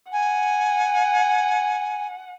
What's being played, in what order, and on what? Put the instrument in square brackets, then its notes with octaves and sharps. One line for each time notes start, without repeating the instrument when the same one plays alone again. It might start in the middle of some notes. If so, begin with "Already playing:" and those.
[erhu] F#5 [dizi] G#5